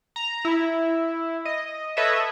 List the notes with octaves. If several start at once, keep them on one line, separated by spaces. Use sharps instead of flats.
A#5
E4
D#5
A4 B4 C#5 D#5 E5